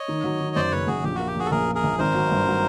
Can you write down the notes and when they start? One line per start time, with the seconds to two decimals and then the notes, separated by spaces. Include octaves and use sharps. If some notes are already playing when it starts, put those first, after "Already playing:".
Already playing: C#5 D#5
0.08 D#3
0.24 F#3
0.40 D#3
0.56 F#2 C5 D5
0.72 F#1 B4 C#5
0.87 F#2 F#4 G#4
1.04 A#1 G4
1.15 A#3 F#4
1.27 G4
1.36 A#1 F#4 G#4
1.46 A4
1.51 A#1 G#4 A#4
1.68 A#3
1.75 G#4 A#4
1.84 A#1
1.99 G#1 A#4 C5
2.14 F#3
2.31 G2
2.47 F#3